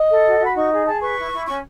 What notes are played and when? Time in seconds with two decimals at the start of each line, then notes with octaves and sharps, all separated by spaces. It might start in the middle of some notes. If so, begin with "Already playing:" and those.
Already playing: D#5
0.09 A4
0.24 F#4
0.40 F#4 B5
0.55 D#4 C#6
0.70 G#4
0.85 G#4 A5
1.01 B4 C#6
1.17 E4
1.32 E4
1.47 C#4 C#6